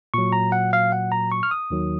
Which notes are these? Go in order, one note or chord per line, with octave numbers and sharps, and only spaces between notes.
A#2 F#3 C#6
A#5
F#5
F5
F#5
A#5
C#6
F6
D#6
D#2 D#3 F#3